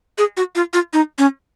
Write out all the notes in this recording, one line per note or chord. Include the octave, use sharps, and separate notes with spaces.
G#4
F#4
F4
F4
D#4
C#4